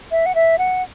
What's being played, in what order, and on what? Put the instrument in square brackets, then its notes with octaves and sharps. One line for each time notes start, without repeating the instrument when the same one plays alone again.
[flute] E5
F#5
E5
F#5